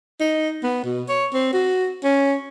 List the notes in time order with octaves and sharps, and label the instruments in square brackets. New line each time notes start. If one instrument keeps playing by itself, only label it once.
[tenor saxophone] D#4
B3
B2
C#5
C4
F#4
C#4